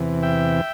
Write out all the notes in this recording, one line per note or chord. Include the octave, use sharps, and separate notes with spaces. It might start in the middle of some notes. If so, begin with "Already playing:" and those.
Already playing: E2 C3 E3
E5 G5